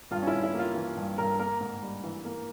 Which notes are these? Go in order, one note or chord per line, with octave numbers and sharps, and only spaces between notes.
G2 F4
C#4
E4
G2
E4
A#3 F4
E3
G2
G2 A#4
A#3 A#4
G#2
G3
E3
A#3